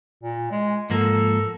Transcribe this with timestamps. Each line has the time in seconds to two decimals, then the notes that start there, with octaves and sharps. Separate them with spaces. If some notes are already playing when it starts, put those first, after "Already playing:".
0.23 A#2
0.51 G#3
0.90 G#2 F3 A#3 A4